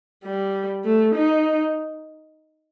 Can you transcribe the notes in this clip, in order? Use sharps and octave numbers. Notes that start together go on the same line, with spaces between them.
G3
A3
D#4